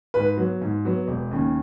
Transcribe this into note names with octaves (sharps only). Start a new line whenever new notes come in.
G#2 B4
F#3 B3
G#2
F#3 B3
E1
D#2 C#3